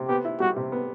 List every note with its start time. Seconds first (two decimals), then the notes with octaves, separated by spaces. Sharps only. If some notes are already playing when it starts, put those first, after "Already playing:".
Already playing: C3
0.08 B3 G4
0.25 E4
0.40 G3 F#4
0.56 C3
0.72 B3